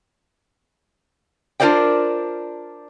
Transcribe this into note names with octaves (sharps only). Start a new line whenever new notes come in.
D4 F4 A#4 C5 D5 G5